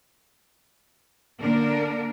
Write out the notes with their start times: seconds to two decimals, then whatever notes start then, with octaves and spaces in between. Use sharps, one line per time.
1.40 D3 A#3 D4 A#4